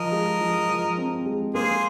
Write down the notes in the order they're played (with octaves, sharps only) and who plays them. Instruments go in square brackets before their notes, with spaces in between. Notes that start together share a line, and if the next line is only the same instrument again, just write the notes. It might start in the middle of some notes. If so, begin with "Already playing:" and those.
Already playing: [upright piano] F3 [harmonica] A#4 D#5
[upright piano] G#3
F3
F3
C4
G#3
[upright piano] A#3 [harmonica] G#4 C5